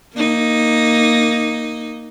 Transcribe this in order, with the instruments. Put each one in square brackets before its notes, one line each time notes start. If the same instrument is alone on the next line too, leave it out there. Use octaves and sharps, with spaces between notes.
[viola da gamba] A#3 D#4